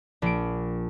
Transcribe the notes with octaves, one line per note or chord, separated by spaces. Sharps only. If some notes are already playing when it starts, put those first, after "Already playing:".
A#1 D7